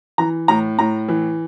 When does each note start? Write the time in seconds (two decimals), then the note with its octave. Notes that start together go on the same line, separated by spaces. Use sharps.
0.18 E3 A#5
0.48 A2 A#5
0.79 A2 A#5
1.08 E3